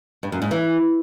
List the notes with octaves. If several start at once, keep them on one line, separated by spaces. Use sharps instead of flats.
G2
F#2
G#2
E3